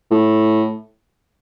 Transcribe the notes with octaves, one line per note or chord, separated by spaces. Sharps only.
A2